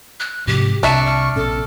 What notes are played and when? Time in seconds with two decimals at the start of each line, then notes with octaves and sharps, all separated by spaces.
0.20 F#6
0.47 G#2 C3 F3 G4
0.83 C2 C3 D4 E5 A5 C#6
1.06 F6
1.36 A#1 B2 C#4 A4